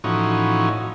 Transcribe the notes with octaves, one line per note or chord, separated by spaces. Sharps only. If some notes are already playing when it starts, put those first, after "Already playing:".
A2 E3 F3 C#4 D#4 F#4